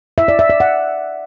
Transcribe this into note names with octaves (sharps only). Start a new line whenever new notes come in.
E5
D5
E5
D5
F#5